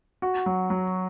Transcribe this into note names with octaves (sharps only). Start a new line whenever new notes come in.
F#4
F#3
F#3